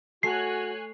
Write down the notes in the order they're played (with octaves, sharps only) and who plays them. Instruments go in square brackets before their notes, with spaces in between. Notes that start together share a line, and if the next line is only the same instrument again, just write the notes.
[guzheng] A3 [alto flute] F#4 [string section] C#5 G#5 F#6 [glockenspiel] C7